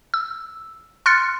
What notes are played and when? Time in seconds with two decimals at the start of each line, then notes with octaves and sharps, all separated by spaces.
0.14 E6
1.06 C6 F6 F#6 A6 C#7